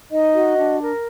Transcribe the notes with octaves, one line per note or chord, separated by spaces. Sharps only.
D#4 D#5
F#4
D4
A#4